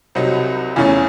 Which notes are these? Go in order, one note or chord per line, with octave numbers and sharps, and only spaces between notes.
C2 C3 F#3 C4 D#4
E2 C#3 E3 A3 C#4